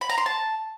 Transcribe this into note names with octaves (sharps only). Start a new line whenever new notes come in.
B5
A#5
C6
A5